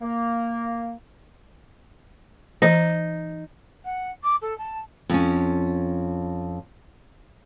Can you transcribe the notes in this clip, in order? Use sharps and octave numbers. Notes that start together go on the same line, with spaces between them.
A#3
E3 D#4
F#5
D6
A4
A5
F2 C#4